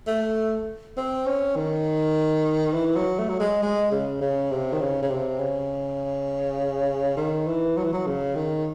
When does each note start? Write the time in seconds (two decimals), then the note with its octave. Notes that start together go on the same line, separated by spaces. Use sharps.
0.07 A3
0.97 C4
1.26 C#4
1.56 D#3
2.74 E3
2.96 F#3
3.19 A3
3.29 F#3
3.40 G#3
3.63 G#3
3.92 C#3
4.21 C#3
4.52 C3
4.73 D#3
4.81 C#3
5.03 C#3
5.11 C3
5.40 C#3
7.17 D#3
7.47 E3
7.77 F#3
7.84 E3
7.93 F#3
8.07 C#3
8.35 D#3